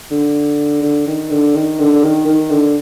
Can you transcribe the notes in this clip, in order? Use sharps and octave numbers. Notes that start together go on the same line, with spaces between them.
D3
D3
D#3
D3
D#3
D3
D3
D#3
D#3
D3